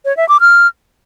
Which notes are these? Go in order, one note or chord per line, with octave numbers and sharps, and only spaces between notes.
C#5
E5
D6
F6